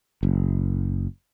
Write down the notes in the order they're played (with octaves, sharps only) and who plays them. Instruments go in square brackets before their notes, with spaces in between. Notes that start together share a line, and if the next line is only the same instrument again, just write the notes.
[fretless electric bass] F#1